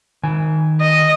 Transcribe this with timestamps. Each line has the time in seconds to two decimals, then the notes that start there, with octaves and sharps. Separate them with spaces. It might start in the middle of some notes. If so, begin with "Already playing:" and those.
0.23 D#3 G#5
0.81 D#5